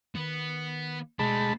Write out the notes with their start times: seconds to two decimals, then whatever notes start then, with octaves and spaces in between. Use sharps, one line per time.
0.15 D#3 B3
1.19 B2 G#3 A3 D4 A5 B5